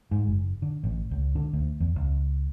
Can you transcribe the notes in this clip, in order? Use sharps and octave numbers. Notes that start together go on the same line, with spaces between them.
G#2
F#1
D3
A1
C#2
D3
D2
E2
C#2